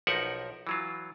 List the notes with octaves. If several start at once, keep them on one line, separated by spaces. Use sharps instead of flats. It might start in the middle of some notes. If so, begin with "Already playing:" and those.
B1 F3 D#4 A#4 E5 F#5
E3 F#3 F4